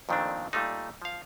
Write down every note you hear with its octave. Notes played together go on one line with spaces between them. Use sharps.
F2 A#2 D#3 A3 C4 D4
A#2 G3 A3 D#4
F3 F5